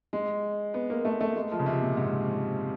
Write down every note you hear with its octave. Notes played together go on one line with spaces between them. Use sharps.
G#3
B3
A#3
A3
A3
G#3
F3
C#3
C3
A#2
G#2